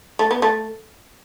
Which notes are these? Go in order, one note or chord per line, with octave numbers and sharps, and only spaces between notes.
A3
B3
A3